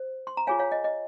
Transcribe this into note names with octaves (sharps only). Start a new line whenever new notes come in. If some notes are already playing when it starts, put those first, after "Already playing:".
Already playing: C5
C6
A#5
F4 G#4 C#5 F5 G#5
C#5 F5
D#5
D#5